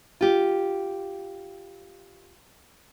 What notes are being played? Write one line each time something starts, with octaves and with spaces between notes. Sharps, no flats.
F4 G4